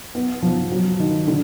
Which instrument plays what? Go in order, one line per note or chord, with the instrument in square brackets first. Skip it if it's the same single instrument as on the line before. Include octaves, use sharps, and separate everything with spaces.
[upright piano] B3
F3
F#3
D#3
D3